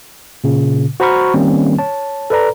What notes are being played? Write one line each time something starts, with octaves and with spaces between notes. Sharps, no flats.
A#2 C#3
F#4 C5 A#5 B5 C#6 F6
D#3 G3 A#3 C4 C#4
C#5 A5
A4 B4 D5 A#5